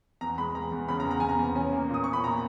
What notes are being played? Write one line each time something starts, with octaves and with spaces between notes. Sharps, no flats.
E2 A#5
G#3 B5
E2 A#5
E2
C#3 B5
A#5
E2
A#5
E2 G#5
A#5
E2
C#4 G#5
A#3
A#2 D#6
C#4 C#6
B5
A#2 A#5